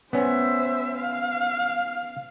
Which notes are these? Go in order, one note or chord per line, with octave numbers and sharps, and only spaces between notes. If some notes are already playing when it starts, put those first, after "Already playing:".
B3 C#4 C5 E5
F5